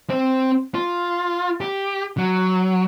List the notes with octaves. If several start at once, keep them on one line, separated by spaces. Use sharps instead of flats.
C4
F4
G4
F#3